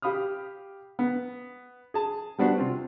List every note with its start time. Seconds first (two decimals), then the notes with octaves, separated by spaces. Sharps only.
0.02 G4 F5 B5 D#6 F6
0.99 B3
1.94 G#4 A5
2.38 G3 B3 D4 F#4 C5
2.58 C3 C4 F4